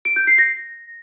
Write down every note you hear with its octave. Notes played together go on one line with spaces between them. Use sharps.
D7
G6
C7
A#6